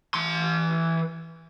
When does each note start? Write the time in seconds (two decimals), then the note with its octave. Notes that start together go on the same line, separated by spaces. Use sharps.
0.14 E3 C6